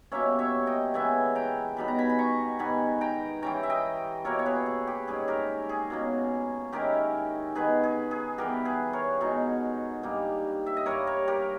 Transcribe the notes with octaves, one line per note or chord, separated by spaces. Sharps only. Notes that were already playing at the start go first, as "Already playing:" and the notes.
B2 G3 A#3 C#4 C#5 E5
C#5 E5
D#5 G5
C#3 E3 G#3 B3 E5 G#5
G5 A#5
B2 G3 B3 D#4 B5
A#5
G#5 B5
B5
A#5 C#6
G#2 D#3 G3 B3 G#5 B5
G5 A#5
E3 G3 C#4 G5 A#5
E5
D#5 G5
B2 A#3 E4 A#4 C#5
C#5
G#4 B4
G#4
G4
G#2 G3 C#4 G#4
G4 A#4
G#4
B2 A#3 C#4
D#3 G#3 C#4 E4 G4 A#4
D#3 G#3 B3 G#4 B4
G#4
G#4
E3 G3 B3 G4 A#4
G#4 B4
A#4 C#5
B2 G#3 D#4
G2 G3 A#3 D#4
E5
D#5
G2 G3 A#3 A#4 C#5
A#4 C#5
G4 A#4